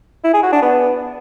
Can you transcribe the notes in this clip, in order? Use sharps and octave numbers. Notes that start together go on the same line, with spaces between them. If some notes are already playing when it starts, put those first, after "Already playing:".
E4
G#4
F#4
D4
B3